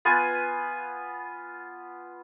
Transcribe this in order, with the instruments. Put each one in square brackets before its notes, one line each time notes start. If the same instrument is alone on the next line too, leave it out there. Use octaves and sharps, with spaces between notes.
[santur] B3 F4 B4 G#5